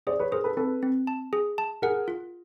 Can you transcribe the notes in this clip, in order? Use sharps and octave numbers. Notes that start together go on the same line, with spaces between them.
G#4 C5 D5
B4 C#5
G#4 A#4 C5
A4 B4
C4 A4 B4
C4
A5
G#4
A5
G#4 A#4 F#5
F4